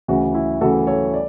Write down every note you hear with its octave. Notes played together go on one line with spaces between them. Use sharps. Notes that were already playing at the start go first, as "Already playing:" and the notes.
D2 C#3 E3 F#4
E4
D2 C#3 E3 F#4 A4
A4 C#5
D5